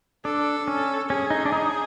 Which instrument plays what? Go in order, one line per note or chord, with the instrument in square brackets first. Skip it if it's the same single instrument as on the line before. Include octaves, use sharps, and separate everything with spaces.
[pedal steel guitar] D4 [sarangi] A4
[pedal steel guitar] C#4
[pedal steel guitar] C#4 [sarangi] G#4
[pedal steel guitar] D#4
D4
D#4